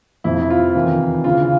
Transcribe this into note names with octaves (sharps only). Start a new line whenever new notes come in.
F2 C3 F3 E4
E4
F4
E2 C3 D#3
D2 C#3 E3 F4